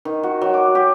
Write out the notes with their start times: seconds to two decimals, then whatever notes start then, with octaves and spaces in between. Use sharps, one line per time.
0.05 D#3
0.23 F#4
0.42 F#3
0.54 D6
0.75 G4